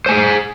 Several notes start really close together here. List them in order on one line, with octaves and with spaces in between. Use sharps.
C5 G#5 G#4